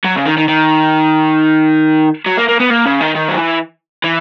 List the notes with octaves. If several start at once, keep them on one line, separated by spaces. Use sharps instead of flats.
F#3
C#3
D#3
D#3
D#3
F#3
A#3
A#3
B3
A#3
C#3
D#3
D#3
F#3
E3
E3